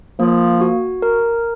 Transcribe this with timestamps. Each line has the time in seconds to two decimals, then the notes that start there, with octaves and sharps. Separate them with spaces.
0.20 F3 A#3
0.61 F#4
1.02 A#4